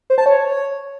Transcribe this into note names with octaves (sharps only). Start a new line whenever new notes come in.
C5
A5
C#5